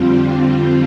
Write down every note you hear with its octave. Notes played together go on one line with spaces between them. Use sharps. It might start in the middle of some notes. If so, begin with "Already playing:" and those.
Already playing: F2 D3 G3 C4 F4